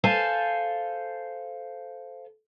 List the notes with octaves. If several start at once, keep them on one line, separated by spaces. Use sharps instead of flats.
A4 C5 F5 G#5 A5